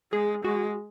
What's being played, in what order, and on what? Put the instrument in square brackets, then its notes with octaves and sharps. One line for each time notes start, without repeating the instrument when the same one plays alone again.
[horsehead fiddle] G#3 [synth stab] G#4
[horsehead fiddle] G#3 [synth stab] F#4